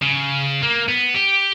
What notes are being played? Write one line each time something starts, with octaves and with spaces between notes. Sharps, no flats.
C#3
A#3
B3
G4